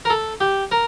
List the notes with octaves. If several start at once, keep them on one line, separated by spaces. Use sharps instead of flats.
A#4
A4
G4
A#4